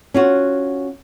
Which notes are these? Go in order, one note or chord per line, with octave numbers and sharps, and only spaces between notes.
C#4 F4 F#4